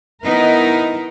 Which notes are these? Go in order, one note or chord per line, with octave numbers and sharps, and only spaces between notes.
D#3 B3 D#4 E4 A#4